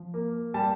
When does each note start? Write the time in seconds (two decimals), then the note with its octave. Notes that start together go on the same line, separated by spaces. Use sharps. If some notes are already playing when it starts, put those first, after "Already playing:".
Already playing: F3
0.14 A#3
0.54 G3 A5